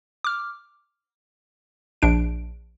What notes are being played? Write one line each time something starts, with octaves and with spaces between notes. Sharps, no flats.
D6 F6
A#1 D4 D7